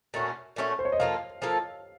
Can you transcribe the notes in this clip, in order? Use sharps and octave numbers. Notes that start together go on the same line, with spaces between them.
A#2 A3 C#4 F#4
A#2 A3 C#4 F#4
C5
C#5
D#5
F3 A#3 F4 A4 F5
F3 A#3 F4 A4